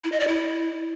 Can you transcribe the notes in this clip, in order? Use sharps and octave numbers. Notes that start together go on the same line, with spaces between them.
E4
D#5
D5
E4